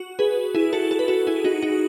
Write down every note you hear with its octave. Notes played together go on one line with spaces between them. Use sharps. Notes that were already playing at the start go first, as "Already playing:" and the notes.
Already playing: F#4
G#4 B4
E4 G#4
F#4 A4
A4
B4
F#4 A4
E4 G#4
D#4 F#4
D#4 F#4